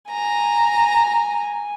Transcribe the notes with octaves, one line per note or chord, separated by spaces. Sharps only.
G#5 A#5